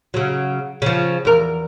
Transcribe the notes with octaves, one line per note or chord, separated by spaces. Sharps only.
C#3 F#3
C#3 F3
E2 A#4